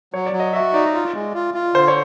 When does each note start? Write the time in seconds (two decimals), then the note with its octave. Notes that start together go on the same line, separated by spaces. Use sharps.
0.14 F#3 C#5
0.26 D5
0.33 F#3
0.40 D#5
0.53 F#4 E5
0.73 D#4 D5
0.95 F4
1.14 G#3
1.34 F4
1.54 F4
1.74 D3 C5
1.88 C#5